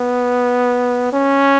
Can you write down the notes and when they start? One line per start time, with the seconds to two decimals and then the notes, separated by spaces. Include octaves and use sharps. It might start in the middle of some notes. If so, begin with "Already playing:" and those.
Already playing: B3
1.13 C#4